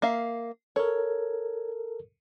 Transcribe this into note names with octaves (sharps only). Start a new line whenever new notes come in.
A#3 E5 F5
A4 A#4 C#5